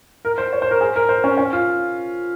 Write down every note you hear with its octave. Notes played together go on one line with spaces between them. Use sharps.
A#4
C5
C#5
C5
A#4
G#4
A#4
C5
C#4
C#4
F4